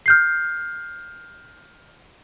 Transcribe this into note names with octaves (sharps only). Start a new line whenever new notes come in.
F6 G6 C7